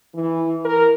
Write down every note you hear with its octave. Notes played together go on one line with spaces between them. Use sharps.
E3
A#4